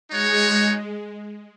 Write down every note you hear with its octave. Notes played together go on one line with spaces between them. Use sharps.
G#3 D#4 F#4 C#5